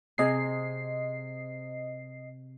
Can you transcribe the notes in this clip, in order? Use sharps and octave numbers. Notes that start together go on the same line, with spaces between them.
C3 C4 G#4 D#5 C7